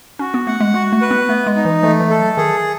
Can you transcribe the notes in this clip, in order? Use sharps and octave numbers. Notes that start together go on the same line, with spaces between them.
C#4 F#4
B3
A3 F#5
G#3
G#3 F#4
A3
B4
B3
A3 B3
G#3
D#4
E3
E3 A3
E3
A4
F#3
D#3 G#4